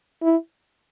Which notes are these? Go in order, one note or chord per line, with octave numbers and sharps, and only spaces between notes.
E4